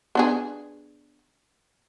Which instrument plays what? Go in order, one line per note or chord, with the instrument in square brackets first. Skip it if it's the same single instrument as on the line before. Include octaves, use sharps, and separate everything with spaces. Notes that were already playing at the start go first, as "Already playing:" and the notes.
[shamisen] B3 D4 G#4